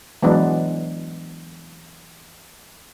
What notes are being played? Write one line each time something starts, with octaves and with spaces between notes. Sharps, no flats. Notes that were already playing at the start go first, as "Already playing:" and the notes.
E3 F#3 G#3 B3 D4